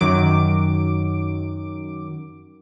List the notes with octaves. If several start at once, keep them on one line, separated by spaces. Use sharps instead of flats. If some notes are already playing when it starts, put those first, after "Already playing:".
F#2 D#3 F#3 D6 D7